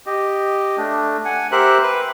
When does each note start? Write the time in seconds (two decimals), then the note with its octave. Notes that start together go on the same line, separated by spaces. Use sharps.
0.06 G4 D#5
0.78 A3 D4
1.25 F#5 G#5
1.52 G4 A#4 C5 E5 F#6
1.83 B4